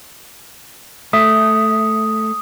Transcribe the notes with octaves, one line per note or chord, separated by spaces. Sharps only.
A3 E5 D#6